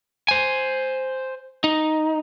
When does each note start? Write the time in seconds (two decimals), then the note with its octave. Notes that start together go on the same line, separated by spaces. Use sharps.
0.28 C5 G#5
1.64 D#4